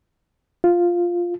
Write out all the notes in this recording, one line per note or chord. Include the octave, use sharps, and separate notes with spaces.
F4